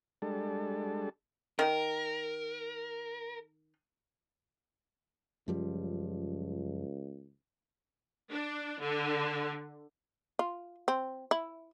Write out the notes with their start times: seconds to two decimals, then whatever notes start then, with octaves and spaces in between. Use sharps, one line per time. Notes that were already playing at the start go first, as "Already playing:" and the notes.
0.22 G3 G#3 D4 A4
1.59 D#3 A#4
5.48 C#2 F#2 F3 G3
8.32 D4
8.82 D3
10.39 F4
10.88 C4
11.31 E4